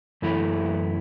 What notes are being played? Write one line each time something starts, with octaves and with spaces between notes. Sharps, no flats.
F#2 E3 A3 E4